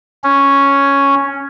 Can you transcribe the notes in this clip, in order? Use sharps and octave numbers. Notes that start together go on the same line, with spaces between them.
C#4